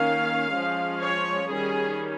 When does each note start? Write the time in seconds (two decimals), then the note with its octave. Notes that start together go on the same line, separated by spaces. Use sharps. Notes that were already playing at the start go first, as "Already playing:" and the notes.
Already playing: D#3 A#3 C#4 F5
0.52 F3 G#3 C#4
1.00 C#5
1.47 D#3 G3 C#4 G#4